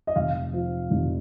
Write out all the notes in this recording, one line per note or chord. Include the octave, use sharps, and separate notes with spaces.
D#5
F1 F5
F3
F1